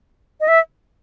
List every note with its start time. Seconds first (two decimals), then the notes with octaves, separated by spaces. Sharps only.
0.41 D#5
0.48 E5